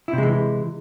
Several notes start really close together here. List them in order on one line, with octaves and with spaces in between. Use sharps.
E4 C3 G#3 E3